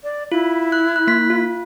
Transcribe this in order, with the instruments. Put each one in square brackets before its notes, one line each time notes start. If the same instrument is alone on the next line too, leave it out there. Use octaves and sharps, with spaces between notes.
[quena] D5
[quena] E4 [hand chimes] F4
[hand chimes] F#6
F#6
A#3 B6
F4